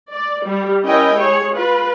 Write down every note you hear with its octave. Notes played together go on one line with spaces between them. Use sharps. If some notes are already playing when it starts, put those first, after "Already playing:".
D5
G3
C#4 E4 A#4 D#5 G5 G#5
G#3 G#4 C#5
F4 B4